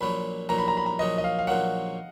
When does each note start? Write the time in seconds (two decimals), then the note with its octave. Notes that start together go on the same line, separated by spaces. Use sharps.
0.01 A#1 A#2 F#3 B5
0.49 A#1 A#2 F#3 A#5
0.58 B5
0.68 A#5
0.77 B5
0.86 A#5
0.99 A#1 A#2 F#3 D#5
1.18 D#5
1.24 F5
1.39 F5
1.47 A#1 A#2 F#3 F#5